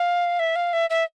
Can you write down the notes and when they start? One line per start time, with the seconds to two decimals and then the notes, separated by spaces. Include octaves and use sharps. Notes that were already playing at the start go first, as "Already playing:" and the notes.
Already playing: F5
0.39 E5
0.56 F5
0.73 E5
0.90 E5